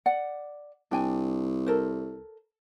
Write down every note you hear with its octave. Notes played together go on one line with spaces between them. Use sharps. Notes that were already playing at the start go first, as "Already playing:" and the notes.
D5 F#5
C2 D4 G5 G#5
A4 A#4 C5